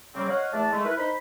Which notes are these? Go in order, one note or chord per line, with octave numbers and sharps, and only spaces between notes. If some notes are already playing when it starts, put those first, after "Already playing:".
C#3 G3 A#3 C4
C#5 D#5 F5 F#5
E2 A3 D4 A5
G#3 A3
E4 A#4 B4
D#4 C5 B5